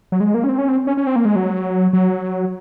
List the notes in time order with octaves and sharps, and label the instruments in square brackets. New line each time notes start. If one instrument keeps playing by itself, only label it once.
[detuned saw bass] F#3
G#3
A#3
C#4
C4
C#4
C4
C#4
C#4
C4
A#3
G#3
F#3
F#3